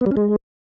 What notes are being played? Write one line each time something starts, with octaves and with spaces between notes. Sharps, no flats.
B3
G3
C#4
G#3